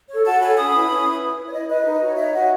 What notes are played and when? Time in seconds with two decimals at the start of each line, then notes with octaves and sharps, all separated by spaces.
0.09 A4 C#5
0.25 F#4 F#5 A5
0.41 A4 C#5 G#5 B5
0.57 C#4 B5 D#6
0.73 E4 B4
0.89 C#4
1.05 E4 B4
1.21 E4
1.37 B4
1.46 C#5
1.53 E4 D#5
1.69 B4 D#5
1.85 D#4
2.01 F#4 C#5
2.17 D#4 C#5 E5
2.33 F#4 C#5 D#5 F#5